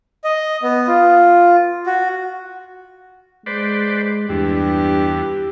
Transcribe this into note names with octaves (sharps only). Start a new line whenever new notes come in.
D#5
B3
F4
F#4
G#3 B4 C5 D5
E2 G2 G4